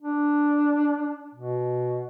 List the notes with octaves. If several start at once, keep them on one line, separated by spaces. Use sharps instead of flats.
D4
B2